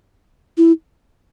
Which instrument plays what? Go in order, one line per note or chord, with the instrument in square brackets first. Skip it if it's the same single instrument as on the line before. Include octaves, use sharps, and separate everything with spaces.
[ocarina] E4